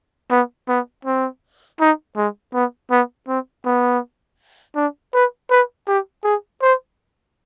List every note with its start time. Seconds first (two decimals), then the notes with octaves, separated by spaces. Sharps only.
0.30 B3
0.69 B3
1.05 C4
1.80 D#4
2.17 G#3
2.54 B3
2.91 B3
3.28 C4
3.65 B3
4.75 D4
5.14 B4
5.50 B4
5.88 G4
6.24 G#4
6.62 C5